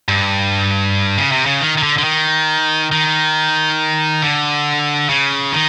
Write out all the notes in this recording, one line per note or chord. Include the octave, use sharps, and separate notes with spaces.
G2
C#3
C3
C#3
D#3
D#3
D3
D3
D#3
D#3
D3
C#3
D#3